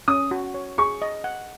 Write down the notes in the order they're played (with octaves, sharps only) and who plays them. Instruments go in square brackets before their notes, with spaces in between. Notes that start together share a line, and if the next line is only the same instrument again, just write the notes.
[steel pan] C#4 [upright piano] D#6
[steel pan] F#4
C#5
[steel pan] G#4 [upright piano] C#6
[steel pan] D#5
F#5